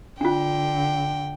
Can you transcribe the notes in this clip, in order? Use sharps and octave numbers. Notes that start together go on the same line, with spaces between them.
D3 D4 F4 G5